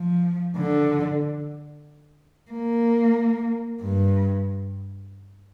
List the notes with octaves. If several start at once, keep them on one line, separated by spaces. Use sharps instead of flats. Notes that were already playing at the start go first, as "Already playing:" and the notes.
Already playing: F3
D3
A#3
G2